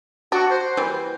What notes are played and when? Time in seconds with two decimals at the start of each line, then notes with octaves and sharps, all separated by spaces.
0.32 D4 F#4
0.50 C5
0.77 E3 G3 A#3